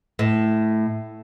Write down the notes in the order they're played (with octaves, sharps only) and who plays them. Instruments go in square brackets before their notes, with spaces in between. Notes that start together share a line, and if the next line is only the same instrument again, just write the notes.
[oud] A2